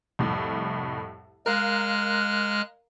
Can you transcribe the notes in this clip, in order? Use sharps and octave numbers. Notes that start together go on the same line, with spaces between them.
C2 F2 A2
G#3 A#4 F5 F6 F#6